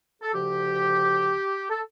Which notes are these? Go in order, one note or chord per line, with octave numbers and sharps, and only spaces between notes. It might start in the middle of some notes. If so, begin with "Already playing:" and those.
A4
D2 C#3 F3 G4
A4